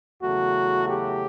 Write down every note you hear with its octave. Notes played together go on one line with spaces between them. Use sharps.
E2 C#3 F#3 A3 F#4
G4